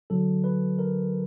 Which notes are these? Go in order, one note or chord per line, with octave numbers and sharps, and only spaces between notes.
D3 F#3 A4
B4
A#4